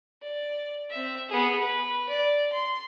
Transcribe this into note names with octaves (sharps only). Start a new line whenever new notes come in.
D5
C4 E5
B3 G#4
B4
D5
C6